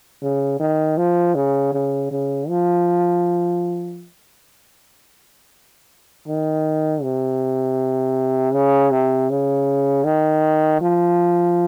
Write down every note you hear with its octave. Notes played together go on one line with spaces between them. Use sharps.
C#3
D#3
F3
C#3
C#3
C#3
F3
D#3
C3
C#3
C3
C#3
D#3
F3